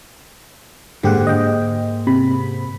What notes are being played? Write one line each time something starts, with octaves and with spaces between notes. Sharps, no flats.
G#2 D3 A#3 G4 G#4 F#5
D#5 G5
C3 B5